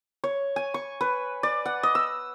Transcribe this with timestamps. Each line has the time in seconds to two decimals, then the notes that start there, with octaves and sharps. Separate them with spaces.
0.24 C#5
0.56 G#5
0.74 C#6
1.01 B4
1.43 D5
1.66 F#5
1.83 D#5
1.95 E6